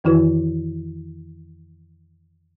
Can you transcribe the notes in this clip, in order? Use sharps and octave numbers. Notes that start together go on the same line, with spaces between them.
F2 D#3 E3 E4 F#4 B4